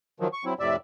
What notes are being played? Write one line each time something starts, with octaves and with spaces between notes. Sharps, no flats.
D#3 F3 F#3
C#6
F#3 C4 E4
F2 A2 C3 D5 E5